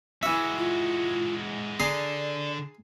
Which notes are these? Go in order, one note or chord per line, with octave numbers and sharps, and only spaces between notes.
E3 G#3 F#4 E5
F4
D3 G#4 D5 A#5 C6